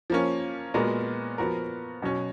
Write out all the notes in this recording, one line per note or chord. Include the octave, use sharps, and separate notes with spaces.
F3 A#3 C#4
A#2 G#3 B3 F#4 A#4
F3 B3 F#4 A#4
B2 F#3 C#4